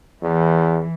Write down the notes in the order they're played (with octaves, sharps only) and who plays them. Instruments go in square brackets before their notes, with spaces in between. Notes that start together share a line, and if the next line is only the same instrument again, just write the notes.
[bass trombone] E2 [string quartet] E3